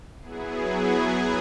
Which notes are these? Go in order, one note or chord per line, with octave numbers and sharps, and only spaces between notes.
F#3 B3 E4 G#4